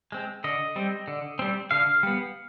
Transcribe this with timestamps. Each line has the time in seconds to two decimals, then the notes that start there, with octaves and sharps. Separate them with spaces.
0.12 G#3 C4
0.44 D3 D#5
0.76 G3 C4
1.08 D3
1.39 G3 C4
1.71 D3 F5
2.03 G3 B3